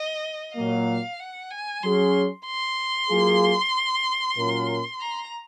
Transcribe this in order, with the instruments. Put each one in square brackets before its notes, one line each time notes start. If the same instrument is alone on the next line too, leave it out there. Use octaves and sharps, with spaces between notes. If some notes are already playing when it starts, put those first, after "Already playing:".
Already playing: [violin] D#5
[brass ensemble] A#2 F#3 A#3 [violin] F5
[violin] F#5
G#5
[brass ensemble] F#3 C#4 G#4 [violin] C6
[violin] C6
[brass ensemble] F#3 A#3 F4 G#4
A#2 F#3 C#4 F4 A#4
[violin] A#5